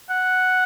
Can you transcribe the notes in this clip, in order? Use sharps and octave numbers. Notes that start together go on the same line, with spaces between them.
F#5